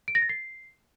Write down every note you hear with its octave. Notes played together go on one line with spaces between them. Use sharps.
D7
A#6
A6
C7